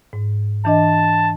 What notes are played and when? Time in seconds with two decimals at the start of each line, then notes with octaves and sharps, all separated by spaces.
0.13 G#2
0.65 E3 D4 D#5 A5